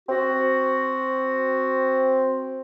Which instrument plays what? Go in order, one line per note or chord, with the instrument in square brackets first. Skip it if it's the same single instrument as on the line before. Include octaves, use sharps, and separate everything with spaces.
[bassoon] C4 [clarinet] F#4